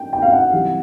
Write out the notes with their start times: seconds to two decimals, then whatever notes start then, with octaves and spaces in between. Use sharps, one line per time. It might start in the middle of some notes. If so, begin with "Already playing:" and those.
Already playing: G5
0.13 G5
0.22 F5
0.33 F#5
0.53 C3 E3 G3